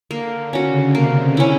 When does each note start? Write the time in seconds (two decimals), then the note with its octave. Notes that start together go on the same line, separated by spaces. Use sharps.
0.11 D3 A#3
0.53 C#4 F#4
0.67 C#3
0.95 C3 A#3
1.37 C#4 E4